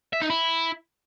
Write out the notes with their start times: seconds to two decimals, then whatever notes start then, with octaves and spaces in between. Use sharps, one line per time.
0.13 E5
0.21 D#4
0.30 E4